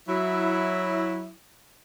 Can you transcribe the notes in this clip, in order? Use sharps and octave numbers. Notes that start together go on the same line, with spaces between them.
F#3 E4